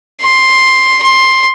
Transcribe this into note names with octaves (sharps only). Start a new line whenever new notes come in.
C6
C6